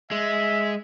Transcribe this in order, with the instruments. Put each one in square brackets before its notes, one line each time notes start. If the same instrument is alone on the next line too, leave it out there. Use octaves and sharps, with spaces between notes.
[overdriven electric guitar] G#3 [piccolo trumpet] E5